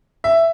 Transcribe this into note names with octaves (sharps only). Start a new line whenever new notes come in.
E5